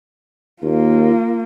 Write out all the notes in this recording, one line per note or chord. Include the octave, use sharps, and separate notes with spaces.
D#2 A#3 F4